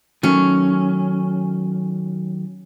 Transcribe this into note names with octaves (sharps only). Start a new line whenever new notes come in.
D#3 F#3 A3 C#4